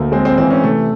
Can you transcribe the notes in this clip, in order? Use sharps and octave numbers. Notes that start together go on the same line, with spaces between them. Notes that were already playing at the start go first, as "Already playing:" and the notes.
Already playing: D2 A3 A#3
G#3 C4
C4
E3 C4
C#4
C3 A3